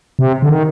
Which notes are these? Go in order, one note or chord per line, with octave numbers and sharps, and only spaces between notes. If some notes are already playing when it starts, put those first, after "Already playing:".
C3
D3
D#3